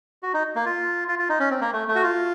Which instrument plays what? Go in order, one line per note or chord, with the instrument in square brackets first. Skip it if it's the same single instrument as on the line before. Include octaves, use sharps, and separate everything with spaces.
[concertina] F#4
D#4
A#3
F4
F4
F4
D#4
C#4
C4
A#3
A3
A3
F#4
F4